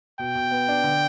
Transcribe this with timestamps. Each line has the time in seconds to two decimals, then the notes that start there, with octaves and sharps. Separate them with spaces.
0.19 B2 G5
0.35 B2
0.51 B3
0.69 D4
0.84 D3